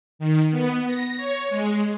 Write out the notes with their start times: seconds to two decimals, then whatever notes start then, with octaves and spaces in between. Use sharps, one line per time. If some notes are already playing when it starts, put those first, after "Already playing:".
0.19 D#3
0.51 B3
0.86 A#6
1.17 C#5
1.50 G#3